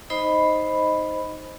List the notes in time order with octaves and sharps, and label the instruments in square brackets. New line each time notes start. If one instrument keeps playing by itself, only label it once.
[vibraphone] D#4 C5 D#5 B5